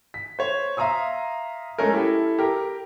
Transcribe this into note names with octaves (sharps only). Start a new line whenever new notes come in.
B6
C5 C#5
E5 F5 A#5 C6 D#6 E6
G#3 A3 C#4 A4 A#4
E4 G4 A4
G4 A#4